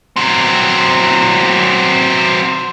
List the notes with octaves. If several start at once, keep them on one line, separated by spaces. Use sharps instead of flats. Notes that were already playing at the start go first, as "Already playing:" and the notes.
F#3 C4